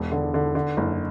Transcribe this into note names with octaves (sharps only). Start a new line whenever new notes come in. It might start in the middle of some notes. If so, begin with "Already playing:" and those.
Already playing: E1
D3
D3
D3
F#1